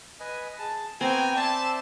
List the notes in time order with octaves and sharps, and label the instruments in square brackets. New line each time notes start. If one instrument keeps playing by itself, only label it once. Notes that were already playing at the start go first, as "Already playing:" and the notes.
[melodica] B4 D#5 G#5
G#4 A5
[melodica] B3 F#4 A#5 [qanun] C4 [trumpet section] G5 G#5
[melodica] C5 D5 [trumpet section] E5 A5